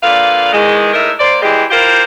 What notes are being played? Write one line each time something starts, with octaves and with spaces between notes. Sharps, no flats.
A#2 D3 B4 F5
E2 D#3 G#3
A2 D#4 A#4 E5
A#3 C5 D5
E3 G#3 G4
E4 F4 G4 A#4 C5